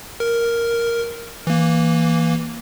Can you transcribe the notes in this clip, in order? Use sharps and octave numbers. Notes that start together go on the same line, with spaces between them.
A#4
E3 A#3